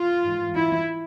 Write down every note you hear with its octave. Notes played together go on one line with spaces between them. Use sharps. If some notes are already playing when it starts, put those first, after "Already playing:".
Already playing: F4
G#2 E3
E4